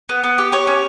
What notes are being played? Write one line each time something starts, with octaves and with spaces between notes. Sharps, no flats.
B3
B3
G4
G4 C#5
C#4